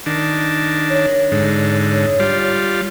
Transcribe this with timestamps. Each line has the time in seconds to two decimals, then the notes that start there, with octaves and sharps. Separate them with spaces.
0.06 D#3 D4
0.90 C#5
1.32 G#2 D3
2.20 G3 F4